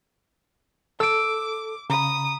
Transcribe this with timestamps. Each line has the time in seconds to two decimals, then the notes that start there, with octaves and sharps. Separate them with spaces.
1.00 A4 D6 E6 D7
1.90 C#3 A#5 B5 D#6